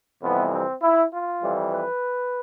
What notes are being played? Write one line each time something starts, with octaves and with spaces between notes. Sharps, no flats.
F2 C3 E3 G3 B3
C4
E4
F4
F2 E3 G3
B4